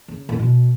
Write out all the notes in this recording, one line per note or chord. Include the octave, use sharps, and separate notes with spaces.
C#3
A2
B2